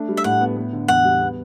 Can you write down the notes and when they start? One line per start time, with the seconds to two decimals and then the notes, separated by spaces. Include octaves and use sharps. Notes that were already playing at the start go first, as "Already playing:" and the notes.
Already playing: A3 D4
0.09 G3
0.17 E5
0.24 A2 F#5
0.41 B3
0.57 B3
0.73 D3
0.88 E2 F#5
1.05 G3
1.21 B3